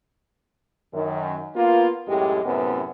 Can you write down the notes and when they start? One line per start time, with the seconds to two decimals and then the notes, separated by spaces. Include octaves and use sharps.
0.94 F#2 D#3
1.55 A#3 B3 F4
2.07 F#2 A2 G#3 G4
2.45 F#2 A2 C3 B3